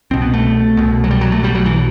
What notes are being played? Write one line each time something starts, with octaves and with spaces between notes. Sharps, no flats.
C2 B2 C4
B3
A3
C2 B2
F#3
G3
F#3
A3
B1 B2 G3
F#3
E3